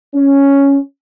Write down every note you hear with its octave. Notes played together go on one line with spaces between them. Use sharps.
C#4